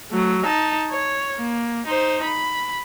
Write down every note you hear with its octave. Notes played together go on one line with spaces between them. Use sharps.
F#3 A3
D#4 A5
C#5
A#3
D#4 C5
B5